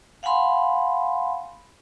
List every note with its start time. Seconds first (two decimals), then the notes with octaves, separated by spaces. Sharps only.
0.23 F5 F#5 G#5 B5 C6